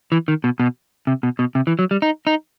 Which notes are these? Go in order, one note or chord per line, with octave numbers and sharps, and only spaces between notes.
E3
D#3
B2
B2
C3
B2
B2
C3
E3
F#3
G3
D#4
D#4